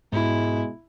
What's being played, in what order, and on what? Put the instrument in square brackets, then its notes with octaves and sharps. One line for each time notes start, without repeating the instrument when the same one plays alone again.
[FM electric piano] G#2 [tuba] B2 [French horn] G#3 [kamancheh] E4